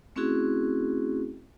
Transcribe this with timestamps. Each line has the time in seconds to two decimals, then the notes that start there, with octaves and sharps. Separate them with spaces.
0.16 A3 C4 C#4 E4 F#4 G#4